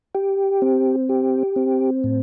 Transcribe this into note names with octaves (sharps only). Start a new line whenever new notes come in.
G4
C4
G4
C4
A2